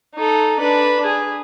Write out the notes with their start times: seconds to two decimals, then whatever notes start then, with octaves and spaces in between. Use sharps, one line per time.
0.15 D#4 A4
0.60 D4 B4
1.05 G#4